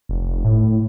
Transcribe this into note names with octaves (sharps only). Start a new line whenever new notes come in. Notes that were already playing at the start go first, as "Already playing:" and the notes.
F1
A2